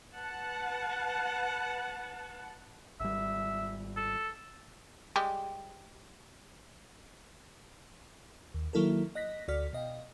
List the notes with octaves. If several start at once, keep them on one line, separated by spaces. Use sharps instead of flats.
B4 F#5 A5
G#1 G3 E5
A4
G3 G#3 G4
D#2
D#3 F#3 A#3 E4 A4 A#4
D#5 F#6 A#6 B6
D2 F#4 D5 F6 B6
B2 D#5 F5 G5